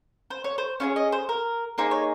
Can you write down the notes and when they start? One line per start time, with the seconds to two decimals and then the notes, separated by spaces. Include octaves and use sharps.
0.30 C5
0.44 C#5
0.58 C5
0.80 C#4 F4 G#4 C#5
0.96 D#5
1.12 C5
1.29 A#4
1.78 A#3 D#4 G#4 C5
1.91 C#5